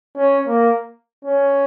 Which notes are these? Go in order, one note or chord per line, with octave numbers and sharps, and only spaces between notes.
C#4
A#3
C#4